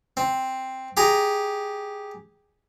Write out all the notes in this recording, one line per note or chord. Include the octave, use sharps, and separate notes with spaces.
C4
G4 G#4 A#5